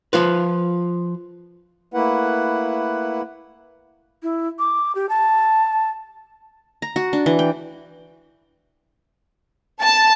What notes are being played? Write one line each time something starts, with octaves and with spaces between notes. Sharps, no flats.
F3 F4 B4
A3 A#3 E4 B4 F#5
E4
D6
G4
A5
A#5
F#4
D4
E3
G5
A5